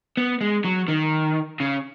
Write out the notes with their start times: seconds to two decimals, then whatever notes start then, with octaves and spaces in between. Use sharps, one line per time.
0.17 B3
0.41 G#3
0.65 F#3
0.88 D#3
1.60 C#3